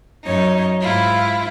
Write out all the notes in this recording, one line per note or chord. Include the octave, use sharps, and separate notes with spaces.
F#2 D#4 C#5
G#2 E4 F4